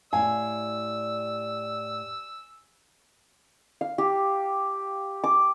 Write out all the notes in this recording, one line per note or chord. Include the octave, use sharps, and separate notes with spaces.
A2 G4 D5 F5 G#5 E6
F5
G4
D6